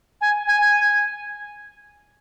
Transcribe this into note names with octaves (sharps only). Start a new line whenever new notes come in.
G#5
G#5